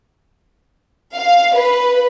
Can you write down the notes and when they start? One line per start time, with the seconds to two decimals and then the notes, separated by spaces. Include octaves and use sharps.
1.16 F5
1.57 B4